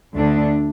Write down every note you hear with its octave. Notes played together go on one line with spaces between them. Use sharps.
D2 D3 A3 D4